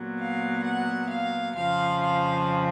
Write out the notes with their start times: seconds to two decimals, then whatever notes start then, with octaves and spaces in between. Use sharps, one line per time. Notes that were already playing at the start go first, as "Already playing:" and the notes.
Already playing: A#2 F#3 B3
0.20 F5
0.66 F#5
1.11 F5
1.56 F2 C#3 F3 F5
2.03 F5